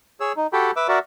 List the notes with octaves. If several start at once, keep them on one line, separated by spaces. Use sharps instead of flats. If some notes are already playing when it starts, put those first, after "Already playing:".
G#4 C#5 E6
D#4
F#4 G4 A4 G5 B5
B4 E5 D6 E6
F#4 A#4 D5 E5